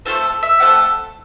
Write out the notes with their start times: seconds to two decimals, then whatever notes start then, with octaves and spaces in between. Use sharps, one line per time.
0.05 A3 C4 F4 A4 C5
0.43 E5
0.60 A3 C4 F4 A4 F#5